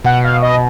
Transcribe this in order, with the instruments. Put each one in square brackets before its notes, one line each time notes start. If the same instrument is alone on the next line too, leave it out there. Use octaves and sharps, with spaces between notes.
[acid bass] B2 [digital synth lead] F#5
[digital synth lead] F5
D#5